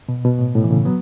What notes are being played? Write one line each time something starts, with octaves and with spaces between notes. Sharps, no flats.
B2
B2
A2
A2
E3
A2 C#3
F#3 B3